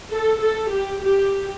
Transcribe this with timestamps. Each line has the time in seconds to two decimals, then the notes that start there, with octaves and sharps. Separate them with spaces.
0.11 A4
0.41 A4
0.71 G4
1.02 G4